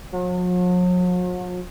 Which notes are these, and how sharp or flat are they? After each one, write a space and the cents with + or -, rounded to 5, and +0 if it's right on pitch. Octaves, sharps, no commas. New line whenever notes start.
F#3 -45